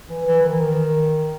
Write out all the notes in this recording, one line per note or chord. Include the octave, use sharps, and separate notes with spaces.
E3
E3
D#3
E3
D#3